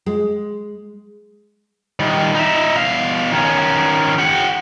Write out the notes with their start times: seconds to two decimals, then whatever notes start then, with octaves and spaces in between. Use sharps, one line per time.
0.06 G#3
2.00 D#3 G3
2.35 D#4 E5
2.76 B2 F5
3.32 D#3 C#4
4.19 G4 F#5